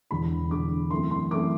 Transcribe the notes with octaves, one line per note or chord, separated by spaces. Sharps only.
E1 E2 D3 B5
E1 E2 D3 D6
F#2 E3 A3 C4 C6
C6
F#2 E3 A3 C4 D6